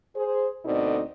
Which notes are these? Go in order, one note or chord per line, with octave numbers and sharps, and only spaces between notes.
G#4 C5
D2 B2 C4 D#4 A4 D5